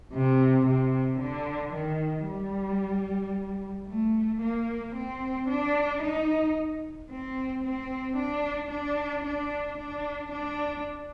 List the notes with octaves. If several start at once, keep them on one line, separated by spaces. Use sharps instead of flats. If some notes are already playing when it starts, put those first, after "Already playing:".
C3
C3
D3
D#3
G3
A3
A#3
C4
D4
D#4
C4
C4
D4
D4
D4
D4
D4